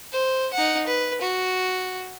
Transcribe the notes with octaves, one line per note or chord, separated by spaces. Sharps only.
C5
D#4 F#5
B4
F#4